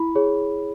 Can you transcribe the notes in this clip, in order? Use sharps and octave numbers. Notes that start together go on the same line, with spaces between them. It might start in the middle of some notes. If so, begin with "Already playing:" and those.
Already playing: E4 B5
G#4 C#5